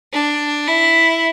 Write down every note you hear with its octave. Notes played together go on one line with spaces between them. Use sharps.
D4
E4